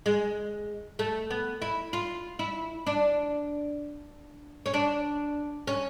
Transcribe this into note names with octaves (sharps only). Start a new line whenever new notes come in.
G#3
A3
B3
E4
F4
E4
D4
C#4
D4
C#4